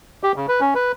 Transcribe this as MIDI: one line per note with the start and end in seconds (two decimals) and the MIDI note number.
0.23 0.32 67
0.36 0.46 49
0.48 0.60 71
0.61 0.74 61
0.75 0.92 71